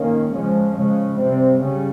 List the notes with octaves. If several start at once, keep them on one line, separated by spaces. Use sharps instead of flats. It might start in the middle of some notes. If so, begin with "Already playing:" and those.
Already playing: D#3 A#3 C#4
C#3 F3 G#3 C#4
C#3 G#3 C#4
C3 G3 C4
C#3 G3 C#4